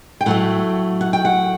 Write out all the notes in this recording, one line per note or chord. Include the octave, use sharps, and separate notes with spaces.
G5
A2 F#3 A3 F#5
F#5
G5
F#5